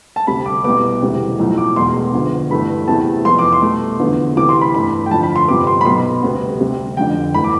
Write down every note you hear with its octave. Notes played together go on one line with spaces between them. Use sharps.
A5
D2 C3 G3 B5
D6
C2 B2 B3 D6
E1 D2 C3 E3 G3
B1 A2 F3 A3
D6
E1 E2 B2 A3 C6
D2 D3 F3 B3
G1 G2 E3 A3 B5
E2 C3 E3 A3 A5
F1 F2 E3 B3 C6
D6
C6
C2 B2 A3
E2 D3 F3 B3
D2 C3 E3 D6
C6
B5
G1 G2 E3 A3 B5
G5
F2 D3 F3 A3 A5
B5
C6
G1 F2 C3 F3 B3 D6
C6
B5
B1 B2 B3 C6
D2 C3 G3 B3
D2 C3 G3
F1 F2 D3 G5
G1 E3 A3 B5
D6